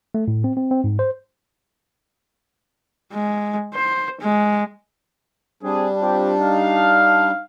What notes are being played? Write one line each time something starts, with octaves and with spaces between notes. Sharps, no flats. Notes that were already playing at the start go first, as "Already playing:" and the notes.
A3
A2
C4
C4
C4
G#2
C5
G#3
C5
G#3
G3 C4 D4 G#4
C4 F4 G4
D#4 F5